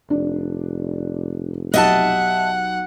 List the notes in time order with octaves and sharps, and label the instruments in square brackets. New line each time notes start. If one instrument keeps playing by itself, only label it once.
[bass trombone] F1 [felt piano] D4
[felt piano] B1 G4 F#6 [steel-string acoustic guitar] D#5 E5 A5 [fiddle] F#5